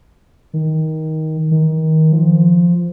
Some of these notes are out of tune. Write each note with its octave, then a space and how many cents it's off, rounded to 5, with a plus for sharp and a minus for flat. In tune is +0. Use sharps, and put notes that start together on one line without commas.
D#3 +15
D#3 +25
F3 -5